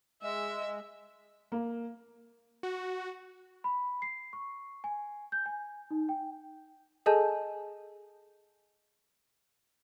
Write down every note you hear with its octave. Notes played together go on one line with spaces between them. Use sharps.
G#3 E5
A#3
F#4
B5
C7
C#6
G#5
G6
G#5
D#4
G5
G#4 A4 D#5 G#5 A5 G6